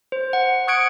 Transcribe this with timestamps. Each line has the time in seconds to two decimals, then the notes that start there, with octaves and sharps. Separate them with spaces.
0.12 C5
0.33 F#5
0.68 C#6 D#6 F#6 G#6 C#7 D7